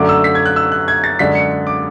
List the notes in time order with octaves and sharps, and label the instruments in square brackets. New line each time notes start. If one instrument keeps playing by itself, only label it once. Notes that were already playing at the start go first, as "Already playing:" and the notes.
Already playing: [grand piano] F#2 D3 F#3 A3 D6
E6
B6
G#6
F#6
E6
F#6
G#6
A6
F#2 D3 G#3 D4 B6
C#7
D6